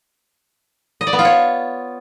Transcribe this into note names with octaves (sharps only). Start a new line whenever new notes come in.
D#5
D5
B3
F4
C#5